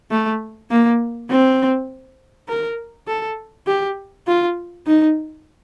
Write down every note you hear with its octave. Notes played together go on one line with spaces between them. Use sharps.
A3
A#3
C4
A#4
A4
G4
F4
D#4